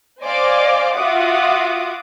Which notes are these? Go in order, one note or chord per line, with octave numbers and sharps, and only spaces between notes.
C5 D5 D#5 F5 G#5 D6
F4 F#4 E5 F#5 D6 D#6